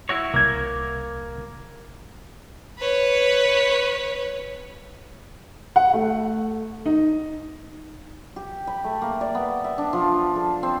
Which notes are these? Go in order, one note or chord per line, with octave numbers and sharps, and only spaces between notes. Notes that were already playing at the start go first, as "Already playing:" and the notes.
E4 F#4 C#5
C2 A#3 G#6
B4 C#5
F#5
A3
D#4
G4
B5
A3
A#3
D5
B3
E5
D4
F3
A4
C4